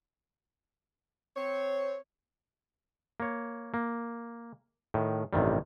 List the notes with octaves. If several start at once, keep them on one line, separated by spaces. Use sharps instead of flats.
C4 C#5
A#3 C#5
A#3
A2 D#3
A1 G2 C3 D#3 G3